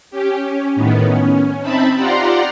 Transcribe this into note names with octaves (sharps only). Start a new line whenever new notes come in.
C#4 G4
C#4
A2 D#3 B3
C#4
C4 D#4 E5 A5 B5
F4 G4 D5 F#5 A#5 C6